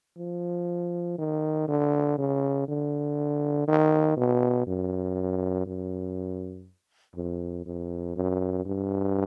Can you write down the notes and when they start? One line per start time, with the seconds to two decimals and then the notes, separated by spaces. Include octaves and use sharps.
0.18 F3
1.18 D#3
1.68 D3
2.18 C#3
2.68 D3
3.67 D#3
4.16 B2
4.67 F#2
5.66 F#2
7.15 F2
7.65 F2
8.16 F#2
8.65 G2